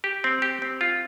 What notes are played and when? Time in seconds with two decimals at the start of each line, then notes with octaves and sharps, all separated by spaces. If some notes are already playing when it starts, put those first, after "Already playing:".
0.04 G4
0.24 C4
0.42 G4
0.62 C4
0.81 F4